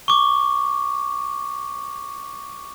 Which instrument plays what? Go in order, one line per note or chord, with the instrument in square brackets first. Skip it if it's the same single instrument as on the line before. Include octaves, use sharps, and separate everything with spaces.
[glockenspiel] C#6 D6